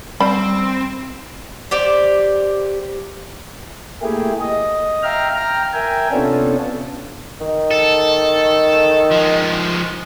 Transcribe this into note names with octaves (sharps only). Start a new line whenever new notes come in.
G3 C4 B5
G4 C5 D5
A3 A#3 E4 G4 G#4
D#5
E5 F5 G5 A#5 F6
G5 A#5 F6
A#4 E5 G5 G#5
C3 B3 C#4 D4 F4 A4
D#3
A4
F3 G#3